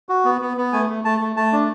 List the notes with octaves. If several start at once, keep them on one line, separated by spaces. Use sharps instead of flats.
F#4
B3
B3
B3
A3 G#5
A3
A3 A5
A3
A3 A5
D4